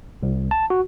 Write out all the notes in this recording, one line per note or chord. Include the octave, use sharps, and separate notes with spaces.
C2
A5
F#4